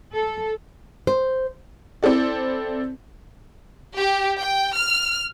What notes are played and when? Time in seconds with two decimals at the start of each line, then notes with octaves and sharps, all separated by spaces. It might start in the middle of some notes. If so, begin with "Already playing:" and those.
0.13 A4
1.07 C5
2.03 C4 E4 A4 D5
3.96 G4
4.39 G5
4.75 F6